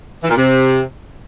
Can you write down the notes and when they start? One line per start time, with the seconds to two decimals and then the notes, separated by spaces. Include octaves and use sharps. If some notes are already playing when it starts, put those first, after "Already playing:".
0.23 E3
0.30 A#2
0.36 C3